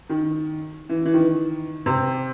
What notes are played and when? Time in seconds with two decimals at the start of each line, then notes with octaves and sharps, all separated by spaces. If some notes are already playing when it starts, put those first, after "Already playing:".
0.09 D#3
0.89 E3
1.05 E3
1.14 D#3
1.86 C3